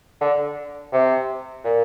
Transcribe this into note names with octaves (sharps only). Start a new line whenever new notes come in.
D3
C3
A#2